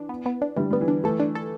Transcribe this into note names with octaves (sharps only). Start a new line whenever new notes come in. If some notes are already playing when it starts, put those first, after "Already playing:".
Already playing: E3 D4
B3
B3
D4
D3 E3 G3
G3 B3
E3
D4
E3 A3 A4
D4
A4